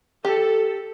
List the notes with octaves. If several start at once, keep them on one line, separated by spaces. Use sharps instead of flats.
G4 A4